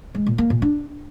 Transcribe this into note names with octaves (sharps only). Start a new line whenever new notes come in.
G#3
A#2
A#3
A#2
D4